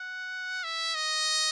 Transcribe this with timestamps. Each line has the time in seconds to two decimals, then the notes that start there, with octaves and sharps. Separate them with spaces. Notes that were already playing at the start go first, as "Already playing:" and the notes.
Already playing: F#5
0.64 E5
0.95 D#5